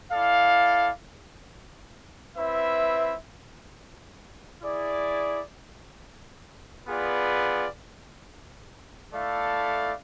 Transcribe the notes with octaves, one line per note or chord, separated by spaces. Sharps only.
E4 A4 D5 F5
C4 E4 B4 E5
E4 G#4 D5
B3 F4 G#4 B4 D5
A3 E4 A4 D5 F5